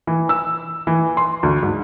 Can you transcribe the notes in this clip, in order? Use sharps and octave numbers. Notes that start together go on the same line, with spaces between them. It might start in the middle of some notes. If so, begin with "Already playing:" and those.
E3
E6
E3
C6
D2
G#2